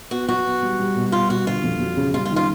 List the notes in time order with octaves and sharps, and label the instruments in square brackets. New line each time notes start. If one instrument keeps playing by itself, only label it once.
[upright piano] B3 [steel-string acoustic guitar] F#4
[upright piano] F#3 [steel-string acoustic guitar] F#4
[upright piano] B3
G3
G3
B2
[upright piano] G3 [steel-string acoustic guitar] F4
[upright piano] B2 [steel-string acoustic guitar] F#4
[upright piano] D3 [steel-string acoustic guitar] F4
[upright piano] F2
F#3
C#3
[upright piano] G3 [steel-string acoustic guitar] F4
[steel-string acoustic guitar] F4
[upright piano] D#3
[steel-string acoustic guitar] F4